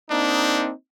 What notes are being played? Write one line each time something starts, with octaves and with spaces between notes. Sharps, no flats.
A#3 C4 D4 D#4